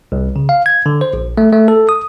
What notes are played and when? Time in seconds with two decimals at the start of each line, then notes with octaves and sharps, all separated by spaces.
0.12 C2
0.36 C#3
0.49 F5
0.66 G#6
0.86 D3
1.01 C5
1.13 A#1
1.38 A3
1.52 A3
1.68 A4
1.89 D#6